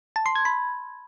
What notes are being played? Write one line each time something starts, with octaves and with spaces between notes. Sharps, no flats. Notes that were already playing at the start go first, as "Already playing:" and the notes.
A5
C6
G#6
B5